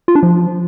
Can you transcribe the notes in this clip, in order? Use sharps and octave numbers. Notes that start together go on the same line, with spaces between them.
F4
D4
F3